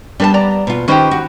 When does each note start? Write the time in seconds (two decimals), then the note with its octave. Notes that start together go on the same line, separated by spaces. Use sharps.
0.20 G3 B3 D4 B4 A5
0.34 D5 A#5
0.67 B2 F4
0.88 D#3 C#4 D#4 G4 B4 C5
1.11 F#4